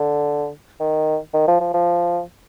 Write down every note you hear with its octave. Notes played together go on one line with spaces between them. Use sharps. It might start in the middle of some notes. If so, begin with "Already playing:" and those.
Already playing: D3
D#3
D#3
F3
F3
F3